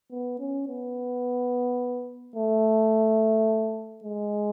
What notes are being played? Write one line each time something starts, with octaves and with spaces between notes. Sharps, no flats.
B3
C#4
B3
A3
G#3